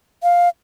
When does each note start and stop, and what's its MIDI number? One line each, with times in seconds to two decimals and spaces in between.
0.23 0.49 77